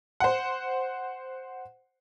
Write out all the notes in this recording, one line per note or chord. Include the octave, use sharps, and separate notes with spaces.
C5 F#5